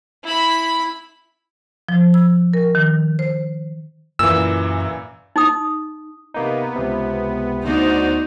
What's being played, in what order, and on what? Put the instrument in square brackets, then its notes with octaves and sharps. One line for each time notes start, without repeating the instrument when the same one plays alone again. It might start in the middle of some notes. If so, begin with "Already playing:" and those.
[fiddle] E4 B5
[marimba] F3
E6
A#4
D#3
C5
[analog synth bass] F#2 [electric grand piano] A#2 E3 [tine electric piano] E6
[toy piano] D#4 D#6
[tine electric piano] C3 A#3 D#4 [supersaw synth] B3
[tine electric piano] C#2 C3
[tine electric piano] D2 [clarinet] B3 [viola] D#4 [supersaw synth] F#4 C5 D5